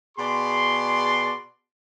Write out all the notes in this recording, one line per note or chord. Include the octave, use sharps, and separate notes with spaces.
B2 G#4 D5 C6